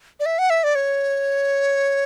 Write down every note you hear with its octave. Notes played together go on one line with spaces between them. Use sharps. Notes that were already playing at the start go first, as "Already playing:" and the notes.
D5
E5
F#5
E5
D5
C#5